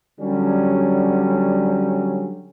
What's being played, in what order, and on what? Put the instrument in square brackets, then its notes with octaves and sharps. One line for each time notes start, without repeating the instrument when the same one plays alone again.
[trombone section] D3 F#3 G3 C#4